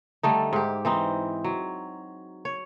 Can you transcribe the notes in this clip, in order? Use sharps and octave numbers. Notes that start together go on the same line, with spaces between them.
D3 G3 A3 D#4
G#2 G4
E3 C4 D#4
F#3
C#5